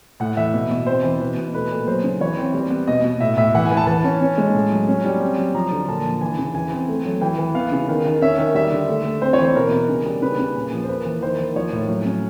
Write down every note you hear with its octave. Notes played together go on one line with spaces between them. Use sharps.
A2 F#5
E3 E5
B2
B2
C4 C5
E3
B2 B4
B2
A3 B4
A#2
F#3 C5
C#3
E3 C#5
C4
G3
B3
B2 D#5
B2
A2 E5
A2 E5
E3 F#5
G#5
E3
A5
E3 A5
C#4
C#4
G#3
A2
F#3
C#4
G3
C4
F#3
F3 A#5
D3
A#2 A5
F3
E3 G#5
C#3
E3 G#5
C4
A3
F#3
E3 G5
E3
B3 F5
C#3
D#3
D#3
C#4 E5
D#3
G3 E5
D3
A3
A3
C4 C5
C#5
E3
C5
B2 A#4
B3
C#3
G3
C#3 B4
C#3
A#2
F3
C5
A#3 B4
E3
D#3 C5
D#3
F3 C#5
A2
F#3
C#4